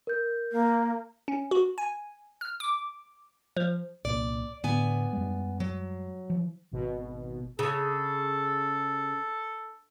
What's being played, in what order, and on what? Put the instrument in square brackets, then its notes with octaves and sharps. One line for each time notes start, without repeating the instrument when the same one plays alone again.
[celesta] A#4 G6
[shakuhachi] A#3
[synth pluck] C#4
F#4
G#5
F6
D6
F3
[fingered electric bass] C2 A#2 [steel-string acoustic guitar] D5
[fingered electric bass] A2 D3 [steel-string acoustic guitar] B3 D5 G#5
[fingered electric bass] F#2 G3 G#3
[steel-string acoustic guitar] F#3
[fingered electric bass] E3 F3
[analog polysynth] G#1 B2
[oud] C#3 [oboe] A4